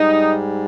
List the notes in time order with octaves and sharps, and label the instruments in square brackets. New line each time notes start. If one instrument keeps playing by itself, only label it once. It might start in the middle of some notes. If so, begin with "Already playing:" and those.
Already playing: [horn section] G#2 G3 D#4